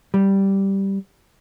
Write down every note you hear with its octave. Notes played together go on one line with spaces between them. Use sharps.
G3